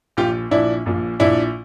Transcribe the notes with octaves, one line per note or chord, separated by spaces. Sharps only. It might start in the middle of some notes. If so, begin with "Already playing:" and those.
A#1 A#2 F3 F4 G4
A#1 A#2 F3 D4 E4
A#1 A#2 F3
A#1 A#2 F3 D4 E4